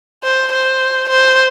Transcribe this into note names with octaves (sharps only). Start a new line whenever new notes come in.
C5
C5
C5